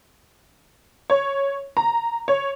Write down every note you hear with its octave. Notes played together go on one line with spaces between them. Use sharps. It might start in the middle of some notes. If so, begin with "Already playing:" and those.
C#5
A#5
C#5